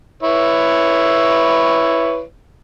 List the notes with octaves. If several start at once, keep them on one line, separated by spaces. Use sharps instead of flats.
E4 B4 C#5